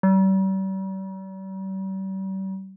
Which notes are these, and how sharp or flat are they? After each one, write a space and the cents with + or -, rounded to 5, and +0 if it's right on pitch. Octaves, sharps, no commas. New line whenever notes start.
G3 -40